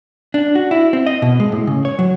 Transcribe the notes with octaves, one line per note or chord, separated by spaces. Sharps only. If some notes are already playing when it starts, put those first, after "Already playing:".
D4
F#4
E4
C4
D#5
B2
G#3
A2
C#3
C#5
F#3